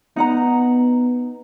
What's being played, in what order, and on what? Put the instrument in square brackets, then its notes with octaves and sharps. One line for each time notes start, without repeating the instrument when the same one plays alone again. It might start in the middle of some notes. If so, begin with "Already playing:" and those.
[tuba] B3 [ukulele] D#4 F#5 A#5